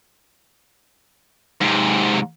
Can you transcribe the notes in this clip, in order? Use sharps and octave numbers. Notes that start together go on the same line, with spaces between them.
G#2 C3